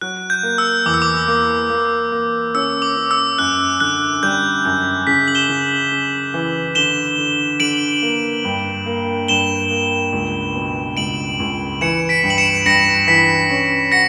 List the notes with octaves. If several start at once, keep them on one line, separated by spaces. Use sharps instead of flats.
F#3 F#6
G6
A#3
E6
E2 D6
E6
D6
A#3
A#3
A#3
C#4 E6
D6
C#4
E6
F#2 F#6
D3 F#6
G3 G6
F#2
C#3 B6
F#7
E7 G7
C#3
C#3
E3
D3 E7 G7
D3
D3 D7 F#7
A#3
G2
A#3
G2 E7 G7
A#3
C#2
B2
C#2 D7 F#7
C#2
E3 C#7 E7
B6 D7
G2
F#7
C#7 E7
G2 A#6 C#7
E3 B6
C#4
F#4 A#6 C#7